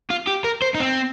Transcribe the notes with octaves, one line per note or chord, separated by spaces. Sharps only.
F4
G4
A#4
C5
D#4
C4